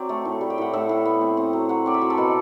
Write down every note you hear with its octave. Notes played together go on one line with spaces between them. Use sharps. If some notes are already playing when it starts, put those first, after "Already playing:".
Already playing: F#3 C4 D5
A3
A2
G3
G5
A2 F#5
A2 E5
A2
B3
C4
C4
F#3
F#3 F#5
C4 D5
E5
F#3
A4
B2 B4